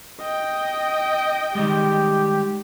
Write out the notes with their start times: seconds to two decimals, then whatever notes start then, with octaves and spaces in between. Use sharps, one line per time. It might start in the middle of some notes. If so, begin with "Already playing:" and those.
0.20 D#5 G5
1.55 D#3 G3 G#3 G4